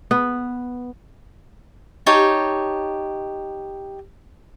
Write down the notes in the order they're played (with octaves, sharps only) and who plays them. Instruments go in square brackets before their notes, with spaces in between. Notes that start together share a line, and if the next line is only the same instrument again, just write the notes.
[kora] B3
[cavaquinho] D#4 G4 C#5 A5